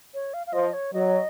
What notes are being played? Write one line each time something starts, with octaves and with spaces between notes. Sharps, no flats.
C#5
F5
F5
F3 D#5
C#5
F#3 D#5